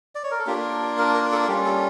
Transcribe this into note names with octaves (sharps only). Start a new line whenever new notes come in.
D5
C#5
A#4
A4
A#3 D4 F4 G4
A#4
A#4
A4
G3 C#4 F4 G4
A4